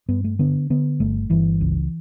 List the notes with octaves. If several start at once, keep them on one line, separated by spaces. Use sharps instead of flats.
G2 B3
A3
D3 B3
D3 B3
G1 A3
G1 E3
C#2